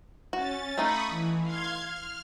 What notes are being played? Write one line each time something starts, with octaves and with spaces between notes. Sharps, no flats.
C#4 F#4 A6
A3 D#4 F4 B5 C#6 D#6
E3
F5 C6 G#6
F6